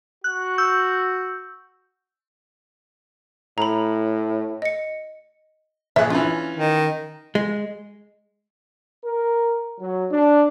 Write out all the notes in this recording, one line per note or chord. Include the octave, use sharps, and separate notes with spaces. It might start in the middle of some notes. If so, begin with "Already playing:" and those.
F#4 F#6
E6 G6
A2 A#5 B5
D#5 C#7
A#1 G#4 E5 F#6
E3 C#4 D4 F4
D#3
G#3
A#4
F#3
D4